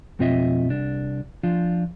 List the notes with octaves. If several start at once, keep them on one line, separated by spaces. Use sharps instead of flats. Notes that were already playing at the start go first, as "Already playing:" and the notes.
F2 B2 C4 F4 D#5 E5
C2 D4
F3 D4 F4